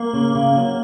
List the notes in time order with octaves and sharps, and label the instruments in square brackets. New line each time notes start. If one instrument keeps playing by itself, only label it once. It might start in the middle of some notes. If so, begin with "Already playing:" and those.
Already playing: [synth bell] A#3
[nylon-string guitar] C#3
C#3
F#3